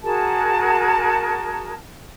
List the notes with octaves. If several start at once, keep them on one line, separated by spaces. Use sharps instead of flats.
F#4 G#4 A#4 A5